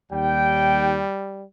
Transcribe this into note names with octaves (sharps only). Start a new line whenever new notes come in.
D#2 G3 G5